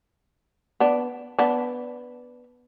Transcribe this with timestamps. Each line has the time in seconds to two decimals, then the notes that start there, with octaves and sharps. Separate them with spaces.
0.80 B3 D4
1.39 B3 D4